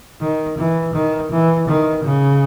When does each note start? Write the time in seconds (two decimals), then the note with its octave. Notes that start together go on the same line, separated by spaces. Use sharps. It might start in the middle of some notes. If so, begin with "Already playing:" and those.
0.21 D#3
0.57 E3
0.94 D#3
1.31 E3
1.67 D#3
2.04 C#3